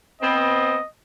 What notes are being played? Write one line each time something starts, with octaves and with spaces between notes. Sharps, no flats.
B3 C4 D#5